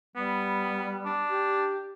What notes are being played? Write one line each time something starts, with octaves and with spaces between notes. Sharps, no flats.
G3 B3
D4
G4